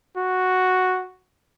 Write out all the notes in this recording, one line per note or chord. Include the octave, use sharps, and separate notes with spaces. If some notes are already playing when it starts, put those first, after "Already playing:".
F#4